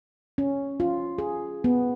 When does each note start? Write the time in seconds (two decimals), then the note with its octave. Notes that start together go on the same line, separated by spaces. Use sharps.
0.38 C#4
0.80 F4
1.18 G#4
1.64 B3